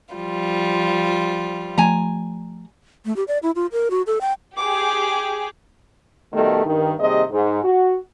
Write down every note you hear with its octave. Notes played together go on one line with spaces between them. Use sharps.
F3 G3 F4
F3 A3 G#5 A#5
A3
G4
D5
E4
F4
A#4
F#4
A4
G5
G4 G#4 D6
B2 D#3 G3 A3
G2 D#3
D#2 C3 G3 G#4 D#5
G#2
F#4